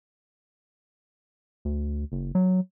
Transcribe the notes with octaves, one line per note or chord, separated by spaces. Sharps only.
D2
F#1
F#3